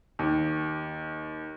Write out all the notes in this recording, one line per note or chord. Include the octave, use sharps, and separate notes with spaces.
D#2